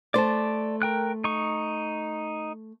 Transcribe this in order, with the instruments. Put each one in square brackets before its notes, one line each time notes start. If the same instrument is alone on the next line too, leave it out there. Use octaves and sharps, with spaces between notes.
[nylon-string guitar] A3 C5 [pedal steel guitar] D5 A5
[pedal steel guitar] A#4 G5 F#6
D#4 C#6